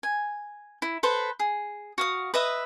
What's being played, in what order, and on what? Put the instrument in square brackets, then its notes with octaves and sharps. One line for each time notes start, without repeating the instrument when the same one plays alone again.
[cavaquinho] G#5
E4
A4 B4 C5 C6
G#4
F#4 F5 D#6
B4 D#5 E5 D#6